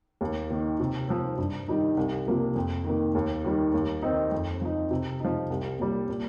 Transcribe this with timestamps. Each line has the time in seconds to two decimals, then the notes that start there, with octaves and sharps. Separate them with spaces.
0.21 D#2
0.50 D#3 A#3 D#4
0.79 C3
1.09 F3 C4
1.38 G2
1.68 D#3 G3 D#4
1.97 C2
2.27 C3 F3 A#3 F4
2.56 F2
2.85 D#3 A#3
3.15 D#2
3.45 D#3 G3
3.74 D#2
4.02 D#3 C4 D#4
4.32 F2
4.61 F3 D#4
4.91 C3
5.20 F3 D#4
5.50 C2
5.79 A#2 G3
6.09 A#2